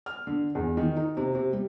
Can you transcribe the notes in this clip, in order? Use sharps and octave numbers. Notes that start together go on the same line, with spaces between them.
F6
D3
E2
D#3
D#4
C3
C3
G3